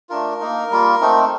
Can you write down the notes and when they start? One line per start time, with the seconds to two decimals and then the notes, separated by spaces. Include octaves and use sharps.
0.09 A3 D4 F4 A#4
0.40 A#3 D#4
0.71 G3 A#3 F4
1.01 A3 C4 D#4